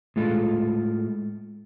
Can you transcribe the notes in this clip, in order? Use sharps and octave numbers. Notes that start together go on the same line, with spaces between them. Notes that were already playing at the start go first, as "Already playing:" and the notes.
A2 G#3 F4 A4